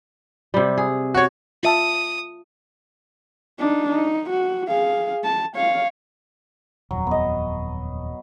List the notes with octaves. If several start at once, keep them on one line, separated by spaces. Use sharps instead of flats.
C3 G3
G#4
F#4 C#5
F4 E5 A5 D#6
D4 D#4
D#4
F#4
G#4 F5
A5
C#5 F5
D#1 F2 F#3
B3 D#5